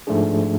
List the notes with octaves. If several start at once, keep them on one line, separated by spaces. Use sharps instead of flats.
G#2 F3 A3 D4 G#4